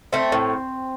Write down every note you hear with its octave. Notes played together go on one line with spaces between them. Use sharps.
A3 C4
A2